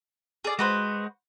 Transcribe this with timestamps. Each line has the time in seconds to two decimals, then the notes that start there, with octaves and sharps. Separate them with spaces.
0.44 G#4 D5
0.59 G#3 F#4 B4 C5